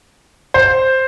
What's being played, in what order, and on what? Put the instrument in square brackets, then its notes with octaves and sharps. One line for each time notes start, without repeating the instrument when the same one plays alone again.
[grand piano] C5